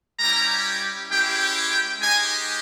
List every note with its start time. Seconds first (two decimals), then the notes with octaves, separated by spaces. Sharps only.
0.20 G3 C#4 E4 G4 A#5
1.09 G#3 C#4 E4 G4 G5
1.39 G5
1.70 G5
2.00 G#3 D#4 G4 G#5